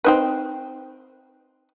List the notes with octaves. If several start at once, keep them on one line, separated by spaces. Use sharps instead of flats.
C4 D#4 B4